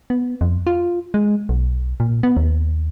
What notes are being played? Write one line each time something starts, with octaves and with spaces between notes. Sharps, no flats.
B3
F2
F4
G#3
B1
A#2
B3
D#2